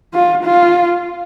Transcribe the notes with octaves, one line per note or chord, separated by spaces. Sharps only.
F4
F4